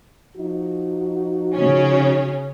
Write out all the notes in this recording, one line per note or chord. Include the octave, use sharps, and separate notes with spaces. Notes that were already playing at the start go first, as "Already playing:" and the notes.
F3 D#4 F#4
C#3 C#4